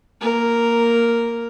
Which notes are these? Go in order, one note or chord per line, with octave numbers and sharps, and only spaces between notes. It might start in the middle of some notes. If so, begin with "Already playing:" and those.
A#3 A#4